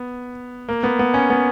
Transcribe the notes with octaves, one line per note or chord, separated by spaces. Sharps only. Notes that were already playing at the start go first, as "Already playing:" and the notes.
Already playing: B3
A#3
B3
B3
C#4
B3